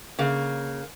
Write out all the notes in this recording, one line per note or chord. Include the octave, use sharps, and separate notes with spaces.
C#3 A#3